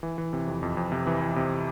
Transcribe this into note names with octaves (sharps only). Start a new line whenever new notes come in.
E3
E3
C3
F2
F2
F2
C3
E3
E3
C3